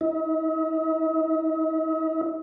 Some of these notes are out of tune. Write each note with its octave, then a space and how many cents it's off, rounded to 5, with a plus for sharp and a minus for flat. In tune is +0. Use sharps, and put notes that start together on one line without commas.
D#4 +45